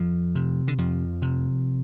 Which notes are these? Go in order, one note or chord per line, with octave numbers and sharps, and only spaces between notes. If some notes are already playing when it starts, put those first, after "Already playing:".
Already playing: F2 F3
C3
D3
F2 F3
C3